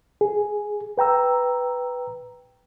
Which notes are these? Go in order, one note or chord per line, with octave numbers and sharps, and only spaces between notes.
G#4
B4 G5 A#5 E6